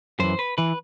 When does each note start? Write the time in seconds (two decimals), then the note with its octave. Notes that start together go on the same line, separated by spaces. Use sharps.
0.19 F#2 E3 C5
0.39 B4
0.58 E3 B4